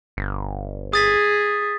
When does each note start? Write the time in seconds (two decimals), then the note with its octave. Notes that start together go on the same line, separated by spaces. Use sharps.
0.17 G1
0.93 G#4 D#6 A6 B6